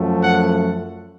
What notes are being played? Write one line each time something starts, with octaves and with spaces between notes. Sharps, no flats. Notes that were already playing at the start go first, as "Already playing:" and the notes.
Already playing: F#2 F3 A3
F#5